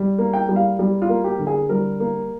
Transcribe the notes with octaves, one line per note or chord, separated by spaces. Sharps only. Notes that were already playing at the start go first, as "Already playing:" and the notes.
Already playing: G3
A#3
G5
G3
F5
G3
F4
A#3
G4
D3
G#4
G3 A#4
A#3